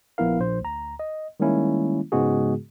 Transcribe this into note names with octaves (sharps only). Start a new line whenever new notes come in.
A#1 F3 B3 E4 A#4 F5
A#1 C5
D2 A#5
D#5
D#3 G3 G#3 A#3 C#4 E4
G#2 C#3 G#3 B3 F#4 G#4